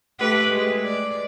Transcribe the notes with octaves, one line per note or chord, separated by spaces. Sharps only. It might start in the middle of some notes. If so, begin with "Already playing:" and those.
A3 G4 B4
G#3
D5